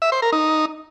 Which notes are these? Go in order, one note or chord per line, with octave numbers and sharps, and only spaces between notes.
E5
C5
A#4
D#4